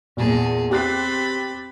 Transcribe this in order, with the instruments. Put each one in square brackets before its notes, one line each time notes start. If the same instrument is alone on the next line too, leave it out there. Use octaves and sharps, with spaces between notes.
[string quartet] E2 G#4 A5 [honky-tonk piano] A#2
[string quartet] C4 B5 A6 [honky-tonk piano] G4 F#6 C7